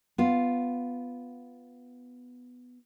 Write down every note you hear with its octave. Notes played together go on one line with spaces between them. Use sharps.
B3 F4